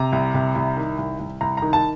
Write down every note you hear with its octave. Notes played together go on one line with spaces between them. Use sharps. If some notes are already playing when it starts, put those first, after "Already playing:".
Already playing: C3 A#5
C2
C3
C2
D#3
C2
C2
C2 A#5
D#3 A#5
A5